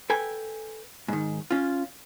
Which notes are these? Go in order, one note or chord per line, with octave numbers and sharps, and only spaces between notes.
A4 B4 G5 G#5
G#2 D#3
C#4 F4